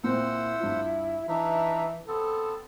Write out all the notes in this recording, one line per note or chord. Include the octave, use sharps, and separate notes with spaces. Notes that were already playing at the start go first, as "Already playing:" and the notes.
A#2 C4 E4 C5 F#5 E6
G2 F4
E3 D4 D#4 B4 E5
B3 C4 A4